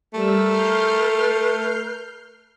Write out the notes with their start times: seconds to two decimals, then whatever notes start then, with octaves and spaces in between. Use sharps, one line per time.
0.14 G3 A3 A#4 E6
0.48 F6 G6 C7